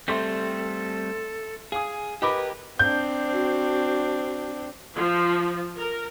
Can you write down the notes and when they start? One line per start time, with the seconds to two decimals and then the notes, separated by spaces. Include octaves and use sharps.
0.08 G3 A3 C4 A4 E5 C6 B6
1.72 G#4 F5 G#5 D#6
2.22 G4 A#4 B4 D#5 B5 D6
2.79 C4 D4 G6
3.33 F#4
4.95 F3
5.78 A#4